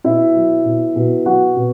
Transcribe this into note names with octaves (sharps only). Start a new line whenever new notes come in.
B2 E4 E5
F#3
B2
B2
F#3 F#4 F#5
B2